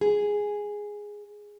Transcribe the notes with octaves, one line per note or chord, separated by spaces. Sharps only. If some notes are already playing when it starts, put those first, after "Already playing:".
G#4